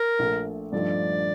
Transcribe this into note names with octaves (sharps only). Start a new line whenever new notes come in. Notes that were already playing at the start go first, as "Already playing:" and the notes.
Already playing: A#4
A#1 A#2 A3
G2 F3 A3 D#4 D5